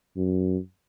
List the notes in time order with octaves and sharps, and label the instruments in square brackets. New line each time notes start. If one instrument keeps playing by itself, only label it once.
[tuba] F#2